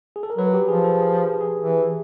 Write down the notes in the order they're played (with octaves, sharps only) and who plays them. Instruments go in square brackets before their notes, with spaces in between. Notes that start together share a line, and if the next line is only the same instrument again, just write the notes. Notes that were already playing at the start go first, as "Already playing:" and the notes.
[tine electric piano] G#4
A4
A#4
[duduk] F#3 [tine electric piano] B4
[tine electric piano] G4
[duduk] F3 [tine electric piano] G#4
[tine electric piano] A4
G#4
G#4
[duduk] E3